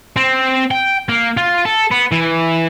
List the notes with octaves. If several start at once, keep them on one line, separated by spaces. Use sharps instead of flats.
C4
G5
A#3
F4
A4
B3
E3